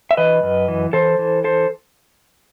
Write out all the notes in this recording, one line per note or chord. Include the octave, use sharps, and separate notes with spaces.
E5
E3 B4 D#5
F#2
E3
E3 A4 C5
E3
A4 C5